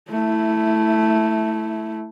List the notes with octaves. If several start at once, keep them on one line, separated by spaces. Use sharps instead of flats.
A3 E4